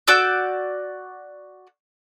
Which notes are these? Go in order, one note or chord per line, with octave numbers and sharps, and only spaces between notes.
F#4 D5 E6 G6